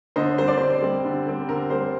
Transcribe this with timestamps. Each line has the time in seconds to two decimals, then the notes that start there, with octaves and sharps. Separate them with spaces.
0.16 D3 C5 D#5
0.38 G3 C4 C5
0.48 D5
0.57 D3 C5
0.82 G3 C4
1.05 D3
1.27 G3 C4
1.48 D3 A#4
1.70 G3 C4 C5